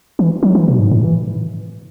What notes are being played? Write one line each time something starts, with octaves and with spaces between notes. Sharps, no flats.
E3
F#3
E3
B2
G#2
A2
E3